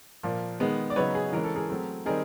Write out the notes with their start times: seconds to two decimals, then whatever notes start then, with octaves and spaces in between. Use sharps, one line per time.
0.23 A#2 F3 A#3
0.60 D#3 G#3 B3
0.90 D5
0.96 C#3 F#3 B3 D#4 B4 C#5
1.15 G#4
1.33 E3 G#3 C#4 A#4
1.44 A4
1.56 G#4 A#4
1.70 F#3 A3 C4
2.06 D#3 G3 C4 D#4 G#4 A#4